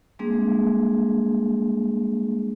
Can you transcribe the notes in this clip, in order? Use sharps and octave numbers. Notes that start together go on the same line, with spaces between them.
G3 G#3 A#3 C4 D4 G#4